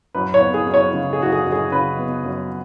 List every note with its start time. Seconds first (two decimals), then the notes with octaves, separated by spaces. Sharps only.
0.15 F#2 B4
0.34 C#5
0.40 B3
0.54 G#4
0.66 F#2
0.74 C#5
0.93 C#3
1.13 G#4
1.19 F#2 F#4
1.32 G#4
1.46 F#2
1.52 G#4
1.72 C#3 B4
1.99 B3
2.25 F#2